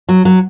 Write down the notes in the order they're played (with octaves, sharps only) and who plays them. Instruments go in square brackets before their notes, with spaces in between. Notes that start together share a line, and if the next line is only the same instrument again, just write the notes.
[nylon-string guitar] F#3
F#3